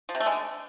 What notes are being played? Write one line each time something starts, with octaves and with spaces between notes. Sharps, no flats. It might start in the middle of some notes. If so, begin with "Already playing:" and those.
F3
C3
A3
G#3
D3